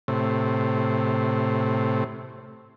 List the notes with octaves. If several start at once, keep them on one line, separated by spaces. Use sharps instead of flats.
A2 C3